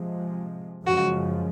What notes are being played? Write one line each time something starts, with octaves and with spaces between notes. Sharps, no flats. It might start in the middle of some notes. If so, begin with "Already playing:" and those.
Already playing: C3 F3 G#3
F#2 C#3 F3 G#3 F#4